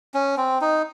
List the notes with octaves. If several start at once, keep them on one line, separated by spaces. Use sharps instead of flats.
C#4
C4
D#4